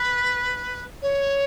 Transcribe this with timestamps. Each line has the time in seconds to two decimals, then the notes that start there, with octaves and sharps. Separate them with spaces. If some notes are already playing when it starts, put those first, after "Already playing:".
Already playing: B4
1.02 C#5